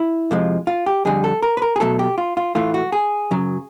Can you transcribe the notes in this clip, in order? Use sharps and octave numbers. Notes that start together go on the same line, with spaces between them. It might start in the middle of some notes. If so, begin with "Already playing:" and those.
Already playing: E4
F2 C3 F3 G#3
F4
G4
F2 D3 G3 G#4
A4
A#4
B4
A#4
G#4
B1 B2 F#3 A3 A4
G4
F4
F4
A2 E3 A3 F4
F#4
G#4
F#2 C#3 F#3